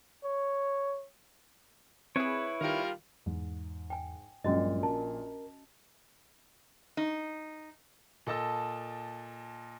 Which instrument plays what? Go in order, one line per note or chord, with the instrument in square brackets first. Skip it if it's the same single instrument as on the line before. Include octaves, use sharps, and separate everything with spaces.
[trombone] C#5
[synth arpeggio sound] C4 G#4 [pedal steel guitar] E4 B4 C#5
[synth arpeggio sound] D#3 [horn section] G3 F4 A#4
[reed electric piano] E2 [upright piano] G#2
[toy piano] G5 G#5
[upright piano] A#1 A#2 [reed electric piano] G2 F#3 G#3 [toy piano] C#4 F#4 D#5
[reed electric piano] A#4 [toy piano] A5
[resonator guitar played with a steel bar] D#4
[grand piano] A#2 A4 D#5 A5 E6